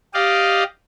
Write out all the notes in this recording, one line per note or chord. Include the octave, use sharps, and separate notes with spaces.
G4 D5 D#5 F5